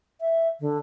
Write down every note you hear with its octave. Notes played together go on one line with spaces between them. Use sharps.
E5
D3